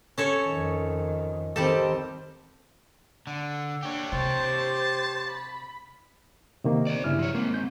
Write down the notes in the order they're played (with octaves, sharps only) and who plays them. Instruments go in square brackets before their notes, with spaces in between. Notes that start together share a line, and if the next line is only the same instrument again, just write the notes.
[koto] C#4 A4 C#5
[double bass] F2 D#3
[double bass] D#3 C4 [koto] G3 G4 A4
[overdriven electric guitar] D3
[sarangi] D4 [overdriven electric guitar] G4 C#5
[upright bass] C3 [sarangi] C5 [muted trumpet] A5
[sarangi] B5
[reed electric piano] C3 D#3 A#3
[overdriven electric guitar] C5 D5
[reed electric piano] G2 E4 F6 [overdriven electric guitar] C#3
[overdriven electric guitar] F3 C#5
[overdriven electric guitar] G#3 C4 [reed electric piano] A#3
[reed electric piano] G6